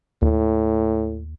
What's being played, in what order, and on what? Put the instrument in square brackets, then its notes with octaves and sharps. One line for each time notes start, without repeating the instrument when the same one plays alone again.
[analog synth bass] D#2 [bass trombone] A2